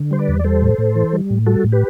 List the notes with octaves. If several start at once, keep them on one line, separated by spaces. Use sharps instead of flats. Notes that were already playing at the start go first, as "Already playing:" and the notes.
Already playing: D3
G3 C5
B4 D5
E2
D5
G3 A4 C5
A2
A2
E3
G3
A2
G3 F#4 A4
A2
G4 B4